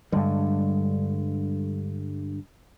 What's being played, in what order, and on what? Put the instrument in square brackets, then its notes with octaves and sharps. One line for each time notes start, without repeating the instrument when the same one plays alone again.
[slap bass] G2 D3 [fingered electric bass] G3 G#3